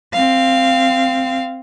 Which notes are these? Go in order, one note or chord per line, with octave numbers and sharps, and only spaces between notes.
C4 F5